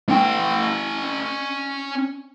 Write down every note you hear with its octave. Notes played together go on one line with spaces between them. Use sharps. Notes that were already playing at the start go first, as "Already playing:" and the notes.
C#4 G5